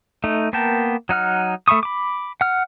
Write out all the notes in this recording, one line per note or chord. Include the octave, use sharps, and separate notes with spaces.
A3 D#4
A#3 B3 A#4 G5 A5
F#3 D#4 F#5 F6
A3 E5 B5 C#6 D#6
B5 D6
F#5 F6